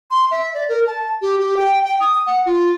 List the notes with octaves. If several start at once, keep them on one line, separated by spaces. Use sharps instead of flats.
C6
E5
D5
A#4
A5
G4
G4
G5
G5
D#6
F#5
F4